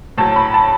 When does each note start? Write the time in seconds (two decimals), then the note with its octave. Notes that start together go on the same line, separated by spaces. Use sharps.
0.18 A2 F#3 A5
0.36 B5
0.54 A5